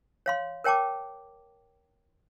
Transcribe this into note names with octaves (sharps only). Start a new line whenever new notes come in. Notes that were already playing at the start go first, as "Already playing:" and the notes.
C#5 F5 C6
A#4 C#5 G5 A5 D6